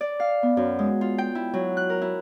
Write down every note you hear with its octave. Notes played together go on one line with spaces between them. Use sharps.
D5
F5
B3
F#2
G#3
F4
G5
E4
F#3
F#6
A#4
E4